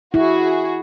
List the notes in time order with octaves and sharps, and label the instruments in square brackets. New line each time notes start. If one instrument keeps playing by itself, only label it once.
[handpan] E4 [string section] F#4 G#4